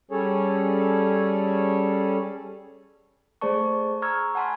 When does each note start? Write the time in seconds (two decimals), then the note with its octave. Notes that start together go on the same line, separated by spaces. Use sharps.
0.11 G3 C#4 G#4 A4 C#5
3.41 A3 G#4 C5 D5 A5 C#6
4.02 A#5 C#6 E6 F6 G#6
4.35 F#5 G#5 A5 B5 C6